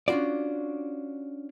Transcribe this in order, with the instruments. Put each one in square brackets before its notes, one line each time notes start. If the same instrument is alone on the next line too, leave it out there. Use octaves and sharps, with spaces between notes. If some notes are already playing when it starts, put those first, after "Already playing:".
[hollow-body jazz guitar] C#4 D4 F4 F#4 D5